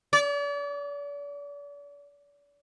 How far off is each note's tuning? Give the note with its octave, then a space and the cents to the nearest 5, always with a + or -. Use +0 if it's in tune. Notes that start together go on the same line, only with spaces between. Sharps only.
D5 -40